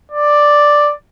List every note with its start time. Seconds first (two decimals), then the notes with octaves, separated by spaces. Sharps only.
0.12 D5